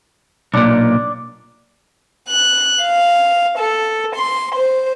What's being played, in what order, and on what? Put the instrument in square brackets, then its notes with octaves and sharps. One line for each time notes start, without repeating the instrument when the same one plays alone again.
[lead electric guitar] B1 A#2 [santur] D4
[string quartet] F#6
F5
A4
C6
C5